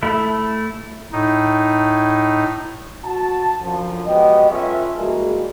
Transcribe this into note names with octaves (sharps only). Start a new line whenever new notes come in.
A3 E4
A2 D#4
F#4 A5
F#2 D3 F3
F#3 G#3 B3 G4 D#5
C#4 F4 A4 B4 E5
E3 G3 G#3 A#3 F#4 G#4